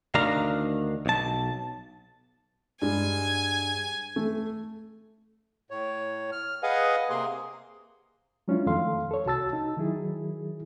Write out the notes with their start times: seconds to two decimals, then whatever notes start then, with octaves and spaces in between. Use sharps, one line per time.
0.15 D2 D#3 D4 F5 A#5
1.06 B1 A5
2.82 G2 G#3 G#5
4.16 A3
5.71 A2 C#5
6.32 F6
6.63 G#4 B4 D#5 F5 F#5 G#5
7.10 C3 A#3 G#4 C6
8.48 F#3 G#3 C#4 D4 E4 F4
8.66 F2 D#3 A3 A4 F5 C6
9.11 A4 C#5
9.26 C2 F#4 A5 E6 A6
9.53 D#4
9.77 D#3 F#3 E4 G#4